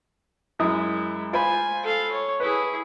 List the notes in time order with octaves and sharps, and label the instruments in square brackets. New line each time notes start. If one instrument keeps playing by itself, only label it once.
[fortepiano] F#2 E4 D#6 [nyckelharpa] G#3
[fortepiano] F4 C5 B5 [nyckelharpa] G#5
[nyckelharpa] A4 F5
C#5
[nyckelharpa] E4 G#4 [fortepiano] B4